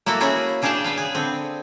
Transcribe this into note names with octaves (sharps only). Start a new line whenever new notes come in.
A#3 E4 F#4 A4
A#3 C#4 E4 F#4 G#4
C#3 D4 G#4 F5 G5 A5
B3 B4 F5
G#4
D3 C4